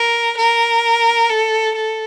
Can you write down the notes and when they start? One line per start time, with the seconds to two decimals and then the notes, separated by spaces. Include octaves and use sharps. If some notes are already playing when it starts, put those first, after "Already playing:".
Already playing: A#4
0.37 A#4
1.29 A4
1.76 A4